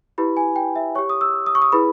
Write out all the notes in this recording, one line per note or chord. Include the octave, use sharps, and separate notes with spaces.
E4 G4 B4 B5
G#5
G5
E5
G4 C#5 C#6
D#6
E6
D#6
C#6
D#6
E4 G#4 B4 B5